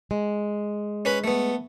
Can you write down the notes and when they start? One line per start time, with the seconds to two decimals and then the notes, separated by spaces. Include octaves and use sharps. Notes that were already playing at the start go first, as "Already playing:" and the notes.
0.11 G#3
1.05 C#4 B4 B5
1.24 A3 B3